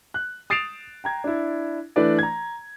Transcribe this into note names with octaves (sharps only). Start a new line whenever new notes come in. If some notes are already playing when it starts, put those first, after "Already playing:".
F#6
D#6 A6 C7 D7 E7 F7
G5 A#5 G#6
D4 E4
E3 A3 D4 E4 B4 D5
A#5 G#6